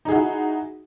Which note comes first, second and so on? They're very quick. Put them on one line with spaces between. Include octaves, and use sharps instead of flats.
D#4 G#4 F#4 E4